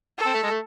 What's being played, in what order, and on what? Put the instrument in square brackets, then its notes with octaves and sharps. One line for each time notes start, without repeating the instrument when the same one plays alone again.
[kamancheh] A4
[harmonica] C4
A3
G#3
A3